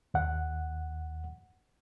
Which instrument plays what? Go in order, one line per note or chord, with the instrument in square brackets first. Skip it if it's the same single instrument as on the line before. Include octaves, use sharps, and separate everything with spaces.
[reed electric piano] D#2 F#5